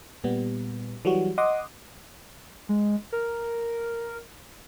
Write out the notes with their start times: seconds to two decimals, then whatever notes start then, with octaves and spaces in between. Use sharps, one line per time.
0.24 A#2 G3 B3
1.05 E3 F#3 G3 F#4
1.38 D#5 F#5 C6 D6 D#6
2.69 G#3
3.12 A#4